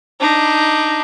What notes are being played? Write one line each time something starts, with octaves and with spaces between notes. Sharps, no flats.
D4 D#4